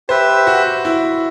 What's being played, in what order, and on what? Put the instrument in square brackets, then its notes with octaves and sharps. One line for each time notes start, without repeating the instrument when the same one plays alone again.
[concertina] G4 B4 E5 [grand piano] C5
[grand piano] F#4
E4